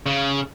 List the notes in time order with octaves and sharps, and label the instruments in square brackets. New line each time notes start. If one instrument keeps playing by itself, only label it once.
[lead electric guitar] C#3